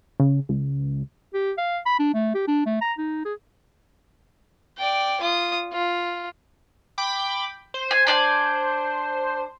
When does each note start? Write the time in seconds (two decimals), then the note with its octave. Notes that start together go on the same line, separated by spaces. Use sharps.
0.20 C#3
0.49 C#2
1.34 G4
1.58 F5
1.86 B5
1.99 D4
2.14 A3
2.34 G4
2.47 D4
2.66 A3
2.81 A#5
2.98 D#4
3.25 G#4
4.77 D5 G5
5.21 F4 D#6
5.72 F4
6.98 G5 B5 D6
7.74 C5
7.91 G#5
8.07 D4 D5 G#5